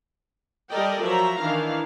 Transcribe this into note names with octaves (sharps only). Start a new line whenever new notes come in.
G3 A4 A#4 D5 D#5 G5
F3 F#3 E5 A#5
D#3 E3 D4 F5